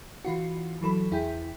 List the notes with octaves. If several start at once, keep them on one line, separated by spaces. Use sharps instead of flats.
E3 F4 F#4
E3 F#3 A4 B5
E2 E4 G#4 G5